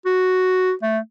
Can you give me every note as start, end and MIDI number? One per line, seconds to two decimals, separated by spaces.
0.06 0.72 66
0.82 0.98 57